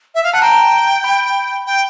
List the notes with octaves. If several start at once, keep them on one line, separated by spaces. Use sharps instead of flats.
E5
F5
F#5 A5
G5 A#5
B5
G5